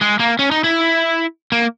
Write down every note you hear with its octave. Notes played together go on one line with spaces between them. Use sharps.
G#3
A#3
C#4
D#4
E4
A#3